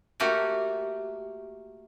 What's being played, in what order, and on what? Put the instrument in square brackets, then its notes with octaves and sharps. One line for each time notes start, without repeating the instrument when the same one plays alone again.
[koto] A3 A#3 F#4 G4